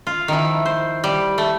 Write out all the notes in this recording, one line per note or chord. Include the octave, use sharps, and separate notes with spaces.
F4
D#3 F3 E4
C5
G3
A3